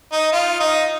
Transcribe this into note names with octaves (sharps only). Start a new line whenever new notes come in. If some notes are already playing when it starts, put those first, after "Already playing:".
D#4
F4
D#4